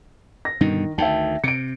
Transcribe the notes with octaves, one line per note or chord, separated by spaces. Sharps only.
A#6
G2 B2 D3 D#3
D2 D#3 E5 G5 A5
C3 C#7 D7